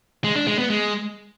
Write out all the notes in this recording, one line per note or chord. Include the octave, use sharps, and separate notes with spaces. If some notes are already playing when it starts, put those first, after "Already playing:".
G#3
D4
G#3
B3
G#3